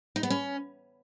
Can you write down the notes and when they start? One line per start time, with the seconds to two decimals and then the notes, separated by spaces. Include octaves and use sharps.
0.16 D#4
0.23 B3
0.30 C#4